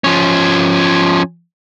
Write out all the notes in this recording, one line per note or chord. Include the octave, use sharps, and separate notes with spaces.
F3 C#4